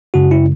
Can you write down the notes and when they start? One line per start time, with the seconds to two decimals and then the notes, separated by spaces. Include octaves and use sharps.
0.14 F#2 C#3 G#3 F#4
0.31 E4